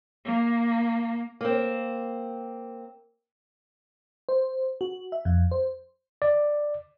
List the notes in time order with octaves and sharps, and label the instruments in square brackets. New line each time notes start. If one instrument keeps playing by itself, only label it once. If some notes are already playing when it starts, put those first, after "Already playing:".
[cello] A#3
[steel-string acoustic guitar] A#3 C4
[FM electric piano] C5
F#4
E5
F2
C5
[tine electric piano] D5